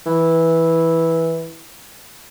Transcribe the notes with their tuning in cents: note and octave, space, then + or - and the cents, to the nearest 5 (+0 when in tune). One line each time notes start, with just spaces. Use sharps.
E3 -10